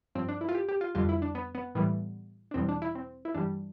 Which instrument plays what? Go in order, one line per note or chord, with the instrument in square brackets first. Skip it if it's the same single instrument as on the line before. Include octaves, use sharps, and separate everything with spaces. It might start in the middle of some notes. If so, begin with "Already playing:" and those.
[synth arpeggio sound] G2 F3 C4
D4
E4
F4
G4
G4
F4
F2 D3 G3 F4
E4
D4
B3
B3
A2 E3 G3 B3
D4
E2 B2 G3 C4
D4
E4
C4
E4
G2 E3 G3 D4